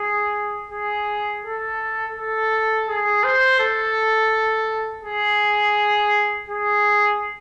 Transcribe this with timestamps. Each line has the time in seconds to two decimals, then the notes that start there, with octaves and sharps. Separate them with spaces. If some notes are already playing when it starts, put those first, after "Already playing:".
Already playing: G#4
0.71 G#4
1.44 A4
2.16 A4
2.89 G#4
3.23 C5
3.59 A4
5.03 G#4
6.49 G#4